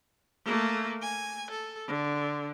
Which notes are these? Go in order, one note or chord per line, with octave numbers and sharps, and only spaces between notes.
A3 A#3
G#5
A4
D3